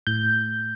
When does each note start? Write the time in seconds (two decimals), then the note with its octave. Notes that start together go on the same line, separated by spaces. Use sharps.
0.07 A2 G6